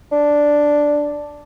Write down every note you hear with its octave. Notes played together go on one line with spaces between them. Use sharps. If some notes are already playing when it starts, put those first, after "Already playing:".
D4